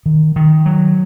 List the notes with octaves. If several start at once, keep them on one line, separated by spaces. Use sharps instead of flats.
D#3
D#3
F#3